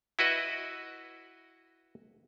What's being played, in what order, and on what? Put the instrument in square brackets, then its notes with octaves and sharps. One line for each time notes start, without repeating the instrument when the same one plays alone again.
[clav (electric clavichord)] E4 F#4 B4 D#5